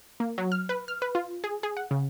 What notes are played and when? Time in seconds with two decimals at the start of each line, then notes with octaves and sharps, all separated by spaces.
0.20 A#3
0.38 F#3
0.52 F6
0.69 B4
0.88 F6
1.02 B4
1.15 F4
1.44 G#4
1.63 G#4
1.77 F#5
1.91 C#3